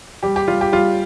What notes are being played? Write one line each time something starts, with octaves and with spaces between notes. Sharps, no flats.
G3 G4
G4
G3 F4
G4
G3 F4